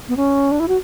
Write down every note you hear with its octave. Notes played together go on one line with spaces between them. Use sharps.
B3
C#4
D4
E4
F#4